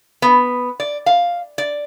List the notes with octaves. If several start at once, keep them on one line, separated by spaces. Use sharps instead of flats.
B3
D5
F5
D5